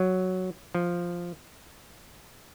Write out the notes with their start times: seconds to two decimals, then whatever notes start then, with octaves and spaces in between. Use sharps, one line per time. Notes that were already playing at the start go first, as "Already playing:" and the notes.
Already playing: F#3
0.75 F3